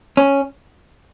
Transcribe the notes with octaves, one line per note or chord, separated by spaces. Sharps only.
C#4